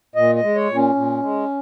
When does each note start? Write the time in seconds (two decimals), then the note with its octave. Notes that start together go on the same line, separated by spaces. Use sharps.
0.15 A#2 D#5
0.35 D#5
0.43 G#3
0.55 C#5
0.69 A#2
0.75 C#4
0.95 A#2
1.22 G#3